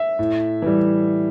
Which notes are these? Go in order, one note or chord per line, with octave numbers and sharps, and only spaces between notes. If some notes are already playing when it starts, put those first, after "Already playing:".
Already playing: E5
A2
E3 G3